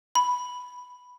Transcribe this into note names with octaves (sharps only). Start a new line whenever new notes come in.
B5